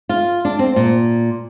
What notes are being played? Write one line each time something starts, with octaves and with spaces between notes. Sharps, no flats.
F4
D4
C4
A#2